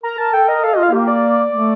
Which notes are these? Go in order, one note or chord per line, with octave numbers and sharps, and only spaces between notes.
A#4 A#5
A#4 A5
A4 G5
A#4 D#5
A4 F5
F4 D#5
F5
A#3 G4
D5
A3